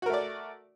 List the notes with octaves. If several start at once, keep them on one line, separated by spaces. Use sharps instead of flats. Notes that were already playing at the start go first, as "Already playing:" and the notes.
A3 F#4 A#4 D5